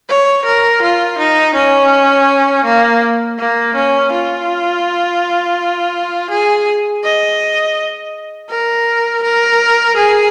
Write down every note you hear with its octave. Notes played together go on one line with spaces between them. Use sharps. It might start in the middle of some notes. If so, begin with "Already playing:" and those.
C#5
A#4
F4
D#4
C#4
A#3
A#3
C#4
F4
G#4
D#5
A#4
A#4
G#4